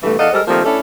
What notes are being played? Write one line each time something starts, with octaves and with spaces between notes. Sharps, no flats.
G2 B2 E3 A3
E2 A4 D5 D#5 F5 F#5
G3 G#3 A4 A#4 C5 D#5
D#3 F3 G3 A3 A#3 C4
A3 C#4 D4 E4 A4